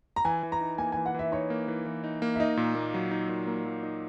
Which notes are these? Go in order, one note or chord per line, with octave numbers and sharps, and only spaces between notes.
A#5
E3 G#5
E3
A#5
D#4
A#3 G#5
E3 G#5
F#5
E3 E5
D#4 C#5
A#3
E3
E3
D#4
A#3
E5
D#4 D#5
A#2
A#3
F#3
D#4
A#2
A#3
F#3
D#4